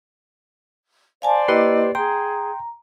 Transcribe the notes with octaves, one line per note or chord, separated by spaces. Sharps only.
C5 D5 F5 G#5 A5
A#3 E4 G4 B4 D#5 C7
G#4 G5 A#5 C6